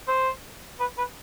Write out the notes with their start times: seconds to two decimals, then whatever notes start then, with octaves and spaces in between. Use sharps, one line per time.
0.08 C5
0.80 B4
0.98 B4